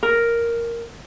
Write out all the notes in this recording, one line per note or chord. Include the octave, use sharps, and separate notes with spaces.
A#4